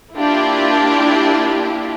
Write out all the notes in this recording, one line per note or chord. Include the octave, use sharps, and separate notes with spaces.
A#3 D4 E4 F4 G4